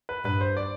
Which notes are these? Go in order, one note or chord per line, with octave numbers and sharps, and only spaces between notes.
B4
G2 B4
C5
D5